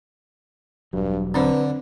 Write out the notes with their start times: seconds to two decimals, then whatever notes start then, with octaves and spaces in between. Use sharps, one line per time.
0.93 E1 G2 F#3
1.34 D3 C4 D4 B4 C5